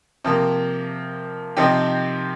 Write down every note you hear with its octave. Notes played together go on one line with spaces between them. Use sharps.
C3 F3 A#3
C3 F3 C4 D#4 G4